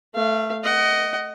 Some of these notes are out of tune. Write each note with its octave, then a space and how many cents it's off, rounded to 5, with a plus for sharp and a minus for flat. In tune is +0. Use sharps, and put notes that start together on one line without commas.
A3 +0 F5 -25
D#5 +0 F#5 +30